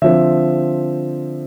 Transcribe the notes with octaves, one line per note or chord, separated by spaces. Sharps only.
D3 F3 C4 E5